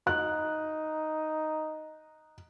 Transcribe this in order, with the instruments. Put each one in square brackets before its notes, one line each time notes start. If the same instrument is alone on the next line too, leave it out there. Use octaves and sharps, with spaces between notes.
[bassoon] D#4 [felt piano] F#6